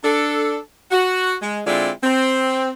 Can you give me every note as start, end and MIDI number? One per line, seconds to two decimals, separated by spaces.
0.03 0.58 62
0.03 0.58 69
0.91 1.35 66
1.42 1.60 56
1.65 1.89 50
1.65 1.89 56
1.65 1.89 60
1.65 1.89 64
1.65 1.89 65
1.65 1.89 74
2.02 2.72 60